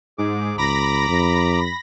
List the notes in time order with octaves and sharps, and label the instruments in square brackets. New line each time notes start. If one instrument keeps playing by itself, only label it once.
[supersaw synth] G#2 [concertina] G#4 D6
[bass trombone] C#2 [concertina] A#5 D6 [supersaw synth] B5 A#6
[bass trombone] F2